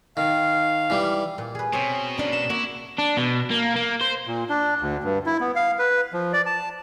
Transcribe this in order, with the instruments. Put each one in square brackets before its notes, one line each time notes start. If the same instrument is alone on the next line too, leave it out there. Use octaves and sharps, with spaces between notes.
[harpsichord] D#3 [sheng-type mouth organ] F5
[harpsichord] E3 G3
[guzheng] A#2
G#4 B4
[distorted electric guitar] B2 [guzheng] C4 C#5
[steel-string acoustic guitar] A#3 C#4 D4
[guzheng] A#5 [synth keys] E7
[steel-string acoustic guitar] A#3 [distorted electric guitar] E4 [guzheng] F#4
[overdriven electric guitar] D4
B2
A#3
A#3
C5
[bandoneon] A#2
D4
D2
G2
E4
B3
F5
B4
F3
D5
A5